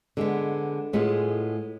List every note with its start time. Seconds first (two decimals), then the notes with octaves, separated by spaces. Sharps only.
0.17 D3 G#3 B3
0.93 A2 G#3 B3 F4 G#4